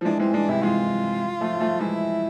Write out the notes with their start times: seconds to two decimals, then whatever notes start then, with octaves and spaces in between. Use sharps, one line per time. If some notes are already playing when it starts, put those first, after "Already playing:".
0.01 F3
0.05 E3 G#3 D4
0.19 E3 G#3 C4
0.34 E3 G#3 D4
0.49 C3 E3 E4
0.63 E3 G#3 F4
1.41 F3 A3
1.60 F3 A3
1.80 E3 G#3 E4